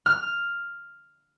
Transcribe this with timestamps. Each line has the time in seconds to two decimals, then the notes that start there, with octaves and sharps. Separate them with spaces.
0.06 F6